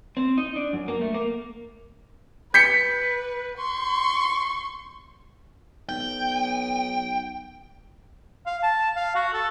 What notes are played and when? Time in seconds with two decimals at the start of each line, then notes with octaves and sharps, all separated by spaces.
0.17 C4
0.38 D#4
0.56 D4
0.73 F#2
0.88 A#3
1.01 A3
1.14 A#3
2.54 B4 G6 B6 C#7
3.58 C6 C#6
5.89 B1 G5
8.46 F5
8.63 A5
8.96 F5
9.16 F#4
9.33 A4